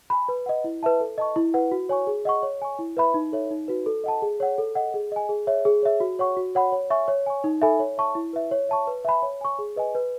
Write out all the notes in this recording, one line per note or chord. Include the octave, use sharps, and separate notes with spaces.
G#5 B5
B4
D#5 F#5
E4
B4 E5 A5
A4
D#5 A5 C#6
E4
B4 F#5
F#4
C#5 G#5 C#6
G#4
D#5 F#5 C#6
C#5
G#5 C#6
E4
B4 E5 B5
D#4
A4 C#5 E5
D#4
F#4 B4
A4
D#5 F#5 A5
G#4
C#5 F#5
A4
D#5 F#5
G#4
D#5 G#5
G#4
C#5 E5
G#4
C#5 E5
F#4
C#5 F#5 C#6
F#4
C#5 F#5 B5
C#5
E5 G#5 C#6
C#5
G#5 C#6
D#4
A4 E5 G#5 B5
C#5
E5 A5 C#6
E4
B4 E5
C#5
E5 A5 C#6
B4
E5 G#5 B5
C#5
G#5 C#6
G#4
B4 D#5 G#5
B4